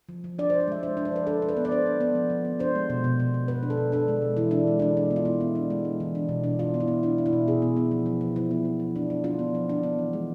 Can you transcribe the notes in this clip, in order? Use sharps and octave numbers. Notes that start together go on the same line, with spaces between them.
F3
F3
D4 D5
C5
D4
D5
G#3 E5
D4 C5
D4
C5
F3 B4
D4 A4
D4
B4
B3
D5
D4 C5
D4
B3
F3
F3
B3
D4 C5
G#3
B2
B2
B2
B2
B2 B4
D4
A4
B2
D4 A4
G#3
B2
E3 E4
G#3 D4
G#3
G#3 D4
D4
B3
F4
B3 E4
B3
D4
G#3
D4
E3
D4
B2
D4
D4 F4
B3
E4
B3
D4 E4
D4
E4
B2
B2 G#4
B3
B3
F3
F3
F3
F3 E4
B3
F3
F3
D4
D4
D4 F4
B3
F3
D4
B3
E3
G#3